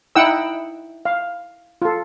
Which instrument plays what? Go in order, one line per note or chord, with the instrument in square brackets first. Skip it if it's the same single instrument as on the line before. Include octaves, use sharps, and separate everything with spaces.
[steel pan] D#4 E4 F#5 G5 E6
F5
F4 A4